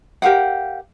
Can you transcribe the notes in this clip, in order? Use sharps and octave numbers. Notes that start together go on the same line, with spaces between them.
G4 A#4 F5 F#5